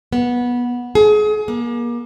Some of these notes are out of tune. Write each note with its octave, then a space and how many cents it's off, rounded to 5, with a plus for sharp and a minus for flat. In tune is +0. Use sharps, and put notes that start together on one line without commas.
B3 -15
G#4 +30
A#3 +35